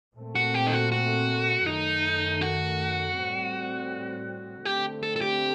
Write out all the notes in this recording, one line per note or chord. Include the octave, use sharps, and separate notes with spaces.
A#2 A3 C4
F#4
G4
D#4
F#4
F#4
F#2 D#3 A3 D#4
F#4
A2 G3 C4
D3 A3 C4 G4
A4
A4
G4